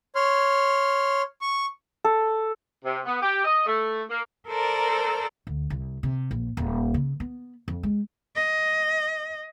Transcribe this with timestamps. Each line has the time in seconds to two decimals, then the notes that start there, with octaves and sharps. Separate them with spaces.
0.15 C#5 C6 F6
1.41 C#6
2.04 A4
2.85 C3
3.06 B3
3.22 G4
3.45 D#5
3.66 A3
4.10 A#3
4.48 A4 A#4 C5 D5 A#5
5.47 D2
5.70 C2
6.03 C3
6.31 A#1
6.57 D#1
6.94 C#3
7.20 B3
7.68 F2
7.83 G#3
8.36 D#5